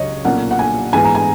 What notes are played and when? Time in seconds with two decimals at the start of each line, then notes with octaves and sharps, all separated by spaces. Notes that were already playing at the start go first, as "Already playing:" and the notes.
Already playing: C#2 C#3 F#3 C#5 D#5
0.25 B1 A#2 A#3 C#4 F#5
0.51 F#5
0.59 G#5
0.93 G#2 E3 B3 G#5
1.05 A#5
1.15 G#5